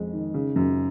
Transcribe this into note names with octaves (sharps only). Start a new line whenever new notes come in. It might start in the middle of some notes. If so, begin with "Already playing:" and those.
Already playing: F2 G#3
D#3
C#3
F#2